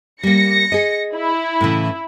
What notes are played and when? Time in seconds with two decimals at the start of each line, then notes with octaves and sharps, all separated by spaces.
0.23 G3 A#3 A#6 C#7
0.72 G#4 D#5
1.17 E4
1.61 A2 C#3 E3